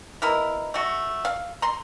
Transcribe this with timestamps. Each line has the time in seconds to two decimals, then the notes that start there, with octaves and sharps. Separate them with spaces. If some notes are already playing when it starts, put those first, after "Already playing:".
0.22 B2 E4 A#4
0.74 A3 F#4
1.25 F5
1.62 A#5 C6